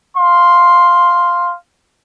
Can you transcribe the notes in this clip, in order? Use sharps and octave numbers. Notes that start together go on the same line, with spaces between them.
F5 C6